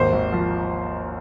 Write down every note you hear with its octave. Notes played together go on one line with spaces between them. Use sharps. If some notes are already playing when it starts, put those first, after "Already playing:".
Already playing: G#1 D#2 C5
G#1
F3